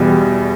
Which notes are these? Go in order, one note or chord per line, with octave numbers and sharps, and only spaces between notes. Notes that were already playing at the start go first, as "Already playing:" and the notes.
Already playing: E2 B2 G3